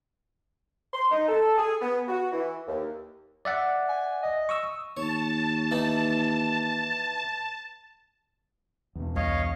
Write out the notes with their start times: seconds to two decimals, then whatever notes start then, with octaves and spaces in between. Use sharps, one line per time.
0.94 C6
1.11 D#4
1.28 A4
1.58 G#4
1.81 B3
2.08 F#4
2.32 E3
2.68 D#2
3.45 D5 E5 F#5
3.89 G#5
4.23 D#5
4.49 C#6 D#6 E6
4.97 D#2 C#5 A5
5.71 E3 D#4 E4
8.95 E2 B2
9.16 C2 C#5 D#5 F5